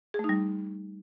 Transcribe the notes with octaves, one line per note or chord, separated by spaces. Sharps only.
G#4
A3
D#4
G3